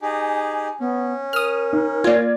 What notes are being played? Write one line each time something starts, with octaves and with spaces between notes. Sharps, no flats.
D#4 G4 G#4 G#5
B3 C#4
A#4 D#6 F6
D#4
A#3 F4 D5 G#6